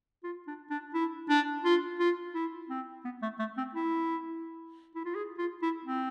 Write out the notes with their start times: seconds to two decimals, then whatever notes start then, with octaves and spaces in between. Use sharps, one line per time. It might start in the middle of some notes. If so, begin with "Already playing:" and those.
0.24 F4
0.47 D4
0.70 D4
0.94 E4
1.30 D4
1.65 F4
1.99 F4
2.35 E4
2.70 C4
3.05 B3
3.22 A3
3.39 A3
3.58 C4
3.75 E4
4.95 E4
5.05 F4
5.15 G#4
5.38 F4
5.62 E4
5.85 C4